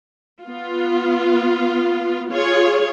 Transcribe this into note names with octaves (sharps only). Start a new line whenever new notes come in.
B3 F4
F4 G#4 C#5